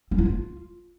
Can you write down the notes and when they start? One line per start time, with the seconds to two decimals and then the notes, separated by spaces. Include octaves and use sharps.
0.11 C#4
0.18 E4
0.25 F4